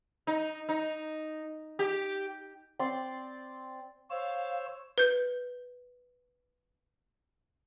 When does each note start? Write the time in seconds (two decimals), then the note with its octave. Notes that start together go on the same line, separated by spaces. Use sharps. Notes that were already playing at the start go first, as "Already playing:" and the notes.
0.27 D#4
0.69 D#4
1.79 G4
2.79 C4 D5 C6
4.10 C5 C#5 F5 E6
4.98 B4 G6